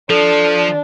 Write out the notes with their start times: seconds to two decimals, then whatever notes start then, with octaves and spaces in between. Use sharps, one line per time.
0.10 F3 D4 A4